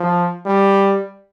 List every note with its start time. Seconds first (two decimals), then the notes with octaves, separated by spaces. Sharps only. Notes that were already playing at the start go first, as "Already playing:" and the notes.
Already playing: F3
0.46 G3